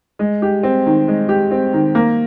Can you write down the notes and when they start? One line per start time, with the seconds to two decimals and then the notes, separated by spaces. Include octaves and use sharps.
0.19 G#3
0.42 G4
0.63 C4
0.86 D#3
1.08 G#3
1.29 G4
1.51 C4
1.73 D#3
1.95 A#3